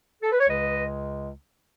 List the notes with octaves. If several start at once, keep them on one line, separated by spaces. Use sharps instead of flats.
A4
B4
C#5
C#2 C#3 G#3 B4 D#5